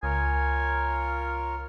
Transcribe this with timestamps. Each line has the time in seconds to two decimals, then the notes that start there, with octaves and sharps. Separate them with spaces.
0.03 C#2 F4 A#4 C#5 G#5